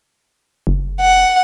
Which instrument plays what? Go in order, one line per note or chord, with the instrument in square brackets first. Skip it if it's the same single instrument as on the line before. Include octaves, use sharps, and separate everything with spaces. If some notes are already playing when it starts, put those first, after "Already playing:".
[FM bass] F#1
[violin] F#5